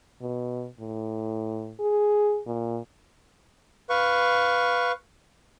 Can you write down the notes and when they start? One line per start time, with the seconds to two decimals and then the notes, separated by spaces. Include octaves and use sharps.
0.21 B2
0.80 A2
1.79 G#4
2.47 A#2
3.90 B4 F5 C#6